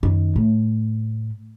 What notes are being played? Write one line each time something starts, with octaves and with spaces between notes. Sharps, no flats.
F#2 D#3
A2